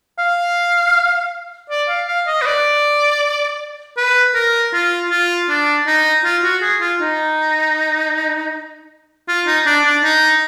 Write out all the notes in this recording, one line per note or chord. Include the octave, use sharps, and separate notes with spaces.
F5
D5
F5
F5
D#5
B4
D5
B4
A#4
F4
F4
D4
D#4
F4
F#4
G#4
F4
D#4
F4
D#4
D4
D4
D#4